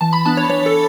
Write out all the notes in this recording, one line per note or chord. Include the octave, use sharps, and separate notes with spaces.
E3 A5
B5
B3 D4 A5
C#5
E3 C#5
A4